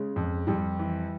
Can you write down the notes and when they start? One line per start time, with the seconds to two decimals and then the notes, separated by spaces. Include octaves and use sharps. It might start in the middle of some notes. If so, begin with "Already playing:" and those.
Already playing: C#3 G#3
0.16 F2
0.47 F2 G3
0.79 E3